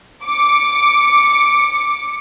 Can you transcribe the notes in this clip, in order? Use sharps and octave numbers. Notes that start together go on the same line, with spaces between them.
D6 C#7